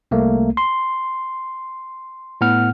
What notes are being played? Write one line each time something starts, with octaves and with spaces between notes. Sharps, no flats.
C2 A3 A#3
C6
A2 B3 F#5 F6